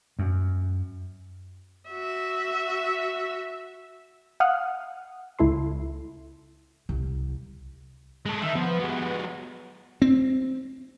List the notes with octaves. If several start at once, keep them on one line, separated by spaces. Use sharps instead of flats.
F#2
F#4 E5
F5 F#5 D#6 F6 F#6
C#2 E4 A4 C6
C2
G#3 A4
D#3 E5
F3 B3
F#3 G#3
C4